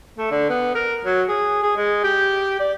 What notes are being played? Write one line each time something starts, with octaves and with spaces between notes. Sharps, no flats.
A3
D3
B3
A#4
F#3
G#4
G#4
G#3
G4
D5